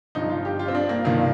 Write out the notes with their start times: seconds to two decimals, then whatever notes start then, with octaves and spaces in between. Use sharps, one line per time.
0.15 G1 G2 F3 D#4
0.30 F4
0.45 G4
0.59 F4
0.68 C4
0.75 D4
0.89 A#3
1.04 G1 G2 D#3 A#3